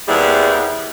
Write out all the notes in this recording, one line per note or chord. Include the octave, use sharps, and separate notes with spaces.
D#2 G3 B3 C4 E4 G#4